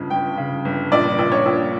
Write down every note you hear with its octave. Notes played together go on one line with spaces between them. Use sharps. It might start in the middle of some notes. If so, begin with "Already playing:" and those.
Already playing: G1 F2 C#3
G1 G5
C#3
G1
A#1 D5
A#1
C#5
A#1